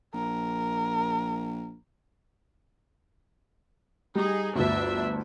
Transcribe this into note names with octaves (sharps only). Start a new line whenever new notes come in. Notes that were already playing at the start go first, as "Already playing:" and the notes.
A#1 A#4
G3 D#4 G#4
G1 D2 D4 E5